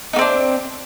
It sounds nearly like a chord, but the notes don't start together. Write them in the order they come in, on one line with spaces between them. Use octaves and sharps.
D#4 A#3 C4 D4